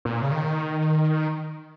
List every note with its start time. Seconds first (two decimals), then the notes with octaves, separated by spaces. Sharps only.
0.05 A#2
0.22 C#3
0.32 D#3